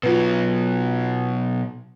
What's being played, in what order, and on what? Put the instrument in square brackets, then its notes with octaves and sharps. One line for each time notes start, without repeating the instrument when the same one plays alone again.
[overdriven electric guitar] B2 F#3 [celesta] F4 B4